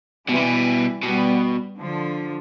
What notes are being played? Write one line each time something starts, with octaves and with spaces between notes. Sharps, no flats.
B2 E3 G3
C3
B2
B2 G3 B3
D3 F3